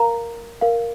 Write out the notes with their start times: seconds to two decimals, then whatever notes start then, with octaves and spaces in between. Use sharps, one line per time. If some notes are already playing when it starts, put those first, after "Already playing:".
Already playing: A#4 F5 A#5
0.61 A#4 F5